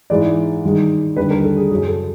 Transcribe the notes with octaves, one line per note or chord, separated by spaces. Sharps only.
G#2 E3 G#3 D5
G2 D#3 G#3
D#2 D3 G3 B4
A#4
A4
G#4
F#2 C#3 F#3 G#4
A4